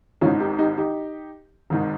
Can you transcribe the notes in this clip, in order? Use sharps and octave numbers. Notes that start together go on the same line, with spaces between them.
G#1 G#2 D#3 C#4 F4
D#4 G4
D#4 G4
D#4 G4
G#1 G#2 D#3